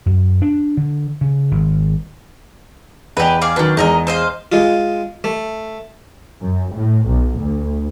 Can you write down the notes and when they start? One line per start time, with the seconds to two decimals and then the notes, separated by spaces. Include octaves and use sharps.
0.06 F#2
0.42 D4
0.77 D3
1.21 C#3
1.51 G#1
3.17 E2 G4 B4 D#5
3.41 G#4 D5 F5
3.56 D#3 F#3 C#4 D4 B4
3.77 E2 G#3 D#4 A#4 D#5
4.07 C5 D#5 F5
4.52 G#3 F4
5.24 A3
6.41 F#2
6.73 A2
7.06 B1
7.39 D2